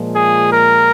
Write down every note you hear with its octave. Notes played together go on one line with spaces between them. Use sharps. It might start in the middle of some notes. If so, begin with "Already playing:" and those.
Already playing: A#2 F3 G#3
G#4
A#4